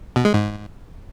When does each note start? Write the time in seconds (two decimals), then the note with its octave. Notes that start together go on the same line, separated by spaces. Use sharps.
0.16 B2
0.25 G#3
0.34 G#2